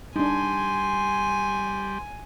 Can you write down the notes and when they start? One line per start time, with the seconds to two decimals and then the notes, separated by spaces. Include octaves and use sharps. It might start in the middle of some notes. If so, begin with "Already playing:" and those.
0.16 G3 D4 D#4 G#5 C6